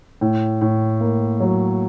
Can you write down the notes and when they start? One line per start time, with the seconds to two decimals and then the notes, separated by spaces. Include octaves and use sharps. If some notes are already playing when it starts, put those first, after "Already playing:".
0.21 A2
0.61 A2
1.01 A#3
1.40 F#3